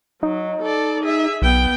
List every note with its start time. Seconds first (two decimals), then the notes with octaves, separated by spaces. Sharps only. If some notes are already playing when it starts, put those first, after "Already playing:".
0.23 F#3 D#4
0.62 A4 D5
1.03 G#4 E5
1.42 B1 B3 G5